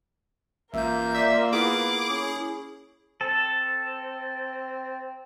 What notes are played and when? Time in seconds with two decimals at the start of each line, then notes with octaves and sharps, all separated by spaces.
0.74 A1 A#3 F4 A#4 E5 G6
1.15 D5 E5
1.53 B3 E4 G#4 D6
2.09 C#4
3.21 C4 A4